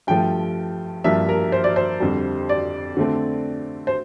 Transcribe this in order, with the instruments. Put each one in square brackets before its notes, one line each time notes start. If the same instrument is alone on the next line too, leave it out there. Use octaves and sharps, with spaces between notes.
[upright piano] G2 F3 A3 G5
G2 F3 A#3 D4 E5
A#4
C5
D5
C5
F2 D3 G3
D5
D3 A3 C4
C5